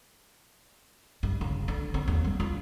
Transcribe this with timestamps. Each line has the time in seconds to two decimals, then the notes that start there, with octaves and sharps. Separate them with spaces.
1.23 G2
1.41 C#3
1.68 D3
1.94 C4
2.08 D#2
2.25 G3
2.40 F4